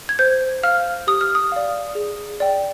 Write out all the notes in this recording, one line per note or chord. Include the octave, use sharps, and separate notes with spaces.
G#6
C5 G6
F5 F6
G4 D#6
F6
D#6
D5 F5
G#4
D5 G5